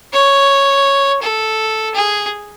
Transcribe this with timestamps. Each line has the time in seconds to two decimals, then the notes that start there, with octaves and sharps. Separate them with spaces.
0.13 C#5
1.22 A4
1.94 G#4